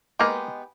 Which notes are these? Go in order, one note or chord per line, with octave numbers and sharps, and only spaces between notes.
G#3 A#3 B3 D#4 G4 B4